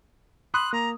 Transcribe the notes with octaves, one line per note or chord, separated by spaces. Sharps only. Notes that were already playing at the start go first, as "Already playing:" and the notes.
B5 C6 D#6 F#6
A#3 A#5